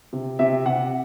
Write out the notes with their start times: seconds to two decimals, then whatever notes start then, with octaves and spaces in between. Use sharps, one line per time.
0.13 C3
0.39 C3 E5
0.66 C3 F#5